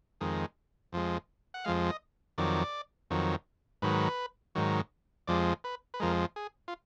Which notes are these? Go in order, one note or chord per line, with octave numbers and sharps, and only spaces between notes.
F2 D#3 G#3
F2 F3 G#3
F#5
F2 F3 G#3 F5
D#5
F2 D#3 F#3 D5
F2 D#3 F#3
G#2 D#3 F#3 B4
G#2 D#3 F#3
F2 F3 G#3 D5
B4
B4
F2 F3 G#3 A#4
G#4
F4